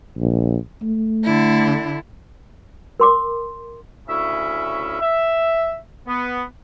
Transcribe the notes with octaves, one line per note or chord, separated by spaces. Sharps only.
A#1
A3
D3 D4 E4
A#4 C6 D6
D2 C#3 C#4 E4 E5
E5
B3